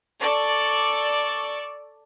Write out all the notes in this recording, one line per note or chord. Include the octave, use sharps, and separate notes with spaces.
A4 D5 C#6